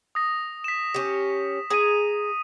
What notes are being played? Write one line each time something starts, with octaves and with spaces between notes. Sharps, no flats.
D#6 A#6
B6 E7
C#4 G4
G#4 A#5 D#6 D#7